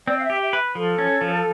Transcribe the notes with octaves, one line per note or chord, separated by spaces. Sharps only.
C4 D5
F5
E5
G4
E5
B4
F3 A4
C#4
F3